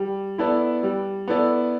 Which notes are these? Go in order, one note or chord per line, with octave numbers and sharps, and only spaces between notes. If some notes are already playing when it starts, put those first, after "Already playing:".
Already playing: G3
B3 E4 A4 D5
G3
B3 E4 A4 D5